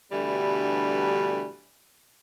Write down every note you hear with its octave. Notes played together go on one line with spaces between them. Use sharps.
G2 B2 D3 E3 G3 A3